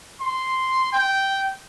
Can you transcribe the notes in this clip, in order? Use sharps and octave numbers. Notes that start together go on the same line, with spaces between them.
C6
G5